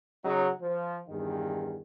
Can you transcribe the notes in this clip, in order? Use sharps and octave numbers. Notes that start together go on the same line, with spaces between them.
C#3 F#3 D#4
F3
E2 G2 D#3